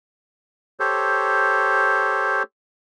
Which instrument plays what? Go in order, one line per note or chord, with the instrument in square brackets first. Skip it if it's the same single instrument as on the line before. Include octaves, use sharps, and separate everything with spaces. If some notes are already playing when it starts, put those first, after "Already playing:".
[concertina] G4 A4 C5 C#5